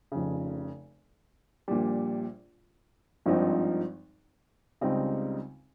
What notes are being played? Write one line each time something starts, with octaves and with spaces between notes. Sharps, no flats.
F1 F2 C#3
A#1 A#2 G3
G#1 G2 F3 C4 D#4
C#2 C#3 G3 C4 D#4